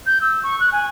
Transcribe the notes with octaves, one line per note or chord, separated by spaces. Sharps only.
G6
E6
C#6
F#6
G#5